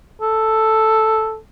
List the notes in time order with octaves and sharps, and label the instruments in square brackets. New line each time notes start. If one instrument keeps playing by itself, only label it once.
[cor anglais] A4